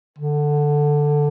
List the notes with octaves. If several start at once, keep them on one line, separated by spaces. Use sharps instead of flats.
D3